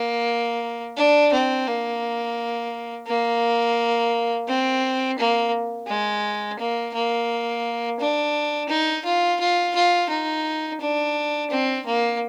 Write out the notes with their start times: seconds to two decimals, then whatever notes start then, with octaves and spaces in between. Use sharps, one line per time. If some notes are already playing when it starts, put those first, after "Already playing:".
Already playing: A#3
0.97 D4
1.32 C4
1.67 A#3
3.07 A#3
4.47 C4
5.18 A#3
5.88 G#3
6.59 A#3
6.94 A#3
7.99 D4
8.69 D#4
9.05 F4
9.40 F4
9.75 F4
10.09 D#4
10.80 D4
11.50 C4
11.85 A#3